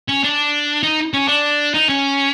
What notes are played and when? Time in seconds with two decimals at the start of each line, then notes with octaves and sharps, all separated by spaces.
0.08 C#4
0.24 D4
0.83 D#4
1.14 C#4
1.28 D4
1.74 D#4
1.89 C#4